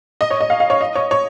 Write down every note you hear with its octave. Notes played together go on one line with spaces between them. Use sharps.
D#5
C#5
D#5
F5
F5
C#5
D#5
C#5
C#5